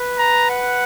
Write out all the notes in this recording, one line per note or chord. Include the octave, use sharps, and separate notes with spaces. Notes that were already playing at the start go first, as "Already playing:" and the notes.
Already playing: B4
A#5
F#5